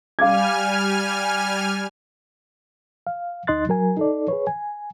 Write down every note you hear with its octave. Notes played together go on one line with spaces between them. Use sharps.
G3 F5 G#5 D6 F6 G#6
F5
D2 D#4 D#5 C6 F#6 A6
F#3 A#4 G#5
D#4 A4 D5
G#4 B4 C#5
G#5